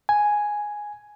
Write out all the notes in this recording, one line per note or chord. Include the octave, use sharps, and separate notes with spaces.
G#5